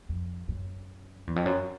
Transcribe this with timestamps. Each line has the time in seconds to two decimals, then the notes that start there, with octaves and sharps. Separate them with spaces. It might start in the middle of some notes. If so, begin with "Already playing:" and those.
0.09 F2
0.48 F#2
1.27 E2
1.36 F2
1.46 F#2